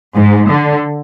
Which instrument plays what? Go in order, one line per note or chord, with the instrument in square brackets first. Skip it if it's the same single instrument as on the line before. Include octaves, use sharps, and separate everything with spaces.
[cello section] G#2
D3